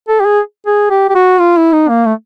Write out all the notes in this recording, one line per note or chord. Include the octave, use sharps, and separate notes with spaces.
A4
G4
G#4
G#4
G4
G4
F#4
F4
E4
D#4
A#3
A3